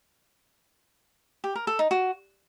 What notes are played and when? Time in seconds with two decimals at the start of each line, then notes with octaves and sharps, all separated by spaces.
1.44 G4
1.55 A#4
1.67 A4
1.79 D#4
1.91 F#4